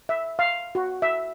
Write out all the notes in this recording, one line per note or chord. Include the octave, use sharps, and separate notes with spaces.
E5
F5
F#4
E5